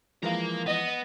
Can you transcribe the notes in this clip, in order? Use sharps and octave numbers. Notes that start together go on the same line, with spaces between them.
E3 F3 G#3 A#4 F5
B3 D#5